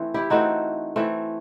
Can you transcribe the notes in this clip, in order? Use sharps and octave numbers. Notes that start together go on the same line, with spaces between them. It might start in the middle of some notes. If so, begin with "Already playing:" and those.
Already playing: E3 A3 C4
E4 G4
E3 A3 C4 D#4 F#4
E3 A3 C4